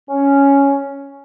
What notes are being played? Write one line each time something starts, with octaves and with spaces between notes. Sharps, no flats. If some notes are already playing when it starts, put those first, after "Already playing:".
C#4